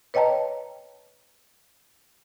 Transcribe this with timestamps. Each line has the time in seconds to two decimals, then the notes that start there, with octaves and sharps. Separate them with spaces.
0.14 B4 C#5 D#5 G5 A5 A#5